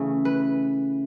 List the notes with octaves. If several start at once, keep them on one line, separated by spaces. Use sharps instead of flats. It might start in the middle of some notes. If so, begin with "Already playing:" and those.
Already playing: C#3 E3 A3 C#4
B4